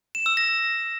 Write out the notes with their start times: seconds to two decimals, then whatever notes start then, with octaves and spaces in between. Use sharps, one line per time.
0.15 E7
0.26 E6
0.37 A#6